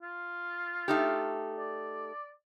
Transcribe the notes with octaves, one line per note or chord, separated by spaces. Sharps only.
F4
A3 D#4 G4
D5